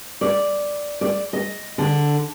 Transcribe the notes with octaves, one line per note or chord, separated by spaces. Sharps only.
D5
D5
D#5
D3